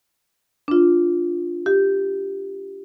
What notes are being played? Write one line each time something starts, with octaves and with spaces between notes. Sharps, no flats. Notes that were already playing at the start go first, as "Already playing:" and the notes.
D4 F4
G4